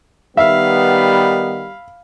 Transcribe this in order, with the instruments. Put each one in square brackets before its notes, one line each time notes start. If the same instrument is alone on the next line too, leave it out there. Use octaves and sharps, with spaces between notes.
[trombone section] D#3 B3 [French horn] G3 [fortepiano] E5 [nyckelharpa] F5 B5